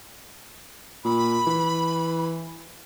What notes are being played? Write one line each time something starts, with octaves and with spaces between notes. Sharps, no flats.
A#2 B5
E3